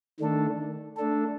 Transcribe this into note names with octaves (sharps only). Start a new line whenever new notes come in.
D#3 A3 D4 A4
A3 D4 A4